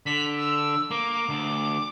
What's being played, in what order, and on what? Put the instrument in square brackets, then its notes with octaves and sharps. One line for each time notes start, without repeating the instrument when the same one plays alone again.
[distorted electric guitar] D3 [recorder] B6
[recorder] E6
[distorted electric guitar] A#3 [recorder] D6
[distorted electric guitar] D2